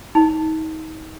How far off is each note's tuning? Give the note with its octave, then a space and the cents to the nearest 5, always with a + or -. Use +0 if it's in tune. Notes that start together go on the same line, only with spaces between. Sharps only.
D#4 +30